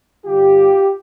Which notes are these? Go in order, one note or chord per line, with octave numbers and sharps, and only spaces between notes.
G2 D3 G3 F4 G4